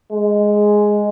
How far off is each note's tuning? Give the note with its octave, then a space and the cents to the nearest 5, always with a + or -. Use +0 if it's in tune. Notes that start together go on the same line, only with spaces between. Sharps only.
G#3 +0